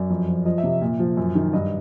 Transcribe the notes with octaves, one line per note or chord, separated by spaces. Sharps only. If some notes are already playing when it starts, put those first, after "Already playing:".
Already playing: F#2 D5
F2
F3
F3 D#5
E5
C3
A#2
F3
F#2
D#3
G2 D#5